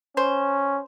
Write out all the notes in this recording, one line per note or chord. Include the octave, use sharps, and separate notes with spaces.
C#4 C5